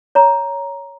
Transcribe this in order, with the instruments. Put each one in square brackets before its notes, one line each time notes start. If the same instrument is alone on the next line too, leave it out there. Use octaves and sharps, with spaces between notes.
[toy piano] C#5 A#5